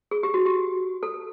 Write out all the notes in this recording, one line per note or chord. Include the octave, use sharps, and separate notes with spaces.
G#4
G4
F#4
G4
A4